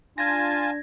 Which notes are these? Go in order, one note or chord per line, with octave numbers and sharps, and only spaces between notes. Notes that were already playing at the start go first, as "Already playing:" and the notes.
D4 F4 G#5 A5 G#6 A#6